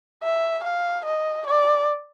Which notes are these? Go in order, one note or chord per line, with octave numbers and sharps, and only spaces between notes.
E5
F5
D#5
D5